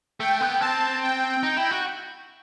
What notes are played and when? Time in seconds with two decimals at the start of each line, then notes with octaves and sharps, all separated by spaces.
0.19 A3 G5
0.40 B3
0.60 C4 A5
1.02 G5
1.43 D#4
1.57 E4
1.71 F#4